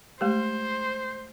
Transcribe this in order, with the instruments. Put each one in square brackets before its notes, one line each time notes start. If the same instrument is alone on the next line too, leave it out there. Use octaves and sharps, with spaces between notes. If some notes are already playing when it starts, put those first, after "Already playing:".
[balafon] G#3 A3 G4 [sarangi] C5